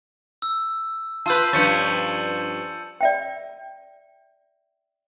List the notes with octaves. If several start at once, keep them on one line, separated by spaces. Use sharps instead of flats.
E6
F4 B4 A5 E6 G6
G2 F3 C#4 A6 C#7 D#7
D5 E5 G5